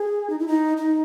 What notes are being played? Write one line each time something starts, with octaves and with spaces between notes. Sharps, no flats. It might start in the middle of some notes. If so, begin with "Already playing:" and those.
Already playing: G#4
D#4
E4
D#4
D#4